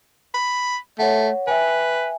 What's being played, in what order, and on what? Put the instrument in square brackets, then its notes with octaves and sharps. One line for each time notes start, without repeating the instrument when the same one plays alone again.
[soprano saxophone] B5
[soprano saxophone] A3 [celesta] C#5 F#5
[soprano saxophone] B4 [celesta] E5 G5 G#5